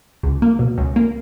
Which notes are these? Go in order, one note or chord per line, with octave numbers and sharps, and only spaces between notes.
C#2
A#3
B2
C#2
A#3